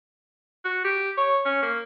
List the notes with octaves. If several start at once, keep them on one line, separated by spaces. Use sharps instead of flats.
F#4
G4
C#5
C#4
A#3